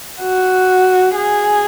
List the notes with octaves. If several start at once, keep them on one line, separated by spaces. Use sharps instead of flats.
F#4
G#4